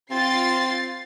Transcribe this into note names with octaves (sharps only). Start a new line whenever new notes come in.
C4 F4 A6 C7